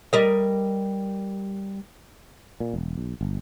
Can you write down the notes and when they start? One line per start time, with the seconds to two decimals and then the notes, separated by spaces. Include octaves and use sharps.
0.13 G3 A#4 D#5
2.60 A#2
2.74 E1
2.97 B1
3.21 G1